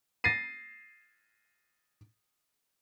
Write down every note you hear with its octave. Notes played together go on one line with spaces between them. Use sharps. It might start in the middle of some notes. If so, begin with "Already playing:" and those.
A6 A#6 C7 D#7